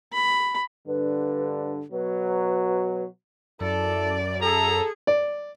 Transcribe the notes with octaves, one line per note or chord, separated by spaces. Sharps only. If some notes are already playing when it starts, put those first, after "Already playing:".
B5
G2 D3 B4
B2 F#3 B4
F#2 E4 A4 D5
G#4 A4 A#5
D5